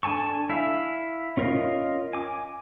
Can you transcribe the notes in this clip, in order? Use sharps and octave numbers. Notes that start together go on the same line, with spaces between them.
D4 A4 G#5 A5 C#6
E4 E5 F5
C#4 F4 A#4 D#5 F5
G#5 D6